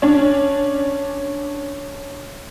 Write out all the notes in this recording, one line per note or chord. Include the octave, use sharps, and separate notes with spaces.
C#4 D4